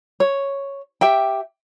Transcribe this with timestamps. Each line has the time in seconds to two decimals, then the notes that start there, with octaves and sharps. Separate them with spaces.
0.20 C#5
1.01 G4 E5 G5